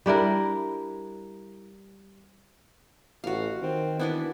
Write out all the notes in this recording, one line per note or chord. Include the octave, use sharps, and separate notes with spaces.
G3 D4 E4 A#4
A1 F#4 F5
D#3 C4
E3 B3 D4 E4